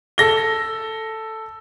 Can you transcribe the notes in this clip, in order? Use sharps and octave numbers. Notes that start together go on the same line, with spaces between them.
A4 A#6 G7